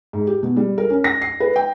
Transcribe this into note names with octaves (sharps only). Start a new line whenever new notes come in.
G#2
G4
B2
G3
A#4
C#4
A#6
C7
B4
G5